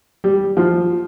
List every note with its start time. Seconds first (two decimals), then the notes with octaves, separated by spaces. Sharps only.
0.24 G3
0.57 F3